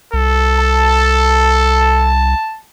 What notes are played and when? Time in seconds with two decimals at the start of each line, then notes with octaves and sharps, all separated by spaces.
0.14 C2 A4
0.58 A5